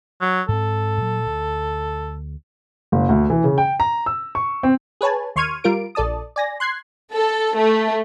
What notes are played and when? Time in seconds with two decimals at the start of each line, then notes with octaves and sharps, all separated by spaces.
0.21 F#3
0.48 G#2 C4 A4
0.97 A#2 F#3
1.25 D2
2.92 F#1
3.09 D2
3.30 E3
3.44 C#3
3.58 G5
3.80 A#5
4.06 E6
4.35 C#6
4.63 C4
5.01 G#4 B4 C#5 G#5 A5
5.36 D#2 C6 C#6 F6 G#6 D#7
5.64 G3 F4 A#4 D7
5.95 A#1 A4 D5 A5 D#6
6.36 D5 G#5 A#6
6.60 C6 F#6 G#6 C7
7.13 A4
7.57 A3